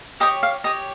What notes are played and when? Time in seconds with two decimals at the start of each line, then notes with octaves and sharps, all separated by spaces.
0.20 G4 C#5 D#5 G5
0.43 F5
0.64 G4 C#5 D#5